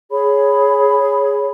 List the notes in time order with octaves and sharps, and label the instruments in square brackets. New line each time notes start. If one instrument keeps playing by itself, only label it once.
[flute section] G#4 C#5 B5